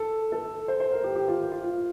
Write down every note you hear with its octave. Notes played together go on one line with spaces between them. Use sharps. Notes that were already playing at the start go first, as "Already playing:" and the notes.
Already playing: A4
A4
C5
C5
A#4
G4
G4
F4
F4
F4
F4